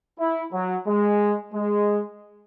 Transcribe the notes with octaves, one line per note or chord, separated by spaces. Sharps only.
E4
F#3
G#3
G#3